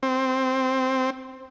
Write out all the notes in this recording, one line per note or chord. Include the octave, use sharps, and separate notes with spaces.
C4